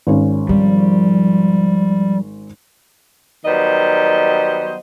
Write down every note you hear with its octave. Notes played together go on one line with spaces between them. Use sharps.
G#1 C#4
F3 G3
D#3 F#3 G3 B3 C5 D#5